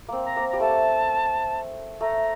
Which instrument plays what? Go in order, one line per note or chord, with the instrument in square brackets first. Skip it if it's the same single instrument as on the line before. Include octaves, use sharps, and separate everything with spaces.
[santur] A#3 C4
[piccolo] A#5
[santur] A#3
[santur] G3 [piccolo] A#5
[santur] A3 [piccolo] A5
[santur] A3 [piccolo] A#5